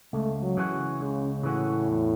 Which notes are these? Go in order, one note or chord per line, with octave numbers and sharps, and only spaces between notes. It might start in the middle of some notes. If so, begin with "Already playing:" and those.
C#2 A3
F#3
C#3 E3 C#4 F#4
C#2 C#3
A2 C#3 E3 C#4 F#4
E2